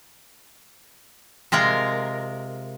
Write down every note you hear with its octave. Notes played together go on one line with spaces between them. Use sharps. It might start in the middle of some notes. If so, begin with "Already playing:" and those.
C3 G#3 F4 A#4